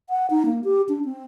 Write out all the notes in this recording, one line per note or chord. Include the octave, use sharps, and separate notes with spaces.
F#5
D#4
A#3
G4
D4
C4